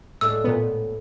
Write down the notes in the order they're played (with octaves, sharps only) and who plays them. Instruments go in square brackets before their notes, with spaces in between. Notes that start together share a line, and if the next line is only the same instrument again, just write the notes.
[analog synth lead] A2 [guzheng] G#3 A3 D4 [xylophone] E6
[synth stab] A#2 B3